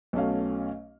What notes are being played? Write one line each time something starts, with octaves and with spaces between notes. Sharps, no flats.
B1 F#3 A3 C#4 F5